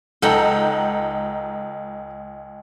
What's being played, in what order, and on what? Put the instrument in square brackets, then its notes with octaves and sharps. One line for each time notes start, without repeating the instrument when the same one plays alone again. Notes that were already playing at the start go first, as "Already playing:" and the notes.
[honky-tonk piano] C#2 D#4 A#5 [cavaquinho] A4 F#5 G5